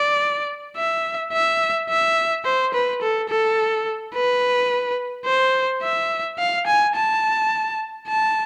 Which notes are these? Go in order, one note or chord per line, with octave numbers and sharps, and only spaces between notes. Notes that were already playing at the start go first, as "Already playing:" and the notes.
Already playing: D5
E5
E5
E5
C5
B4
A4
A4
B4
C5
E5
F5
G#5
A5
A5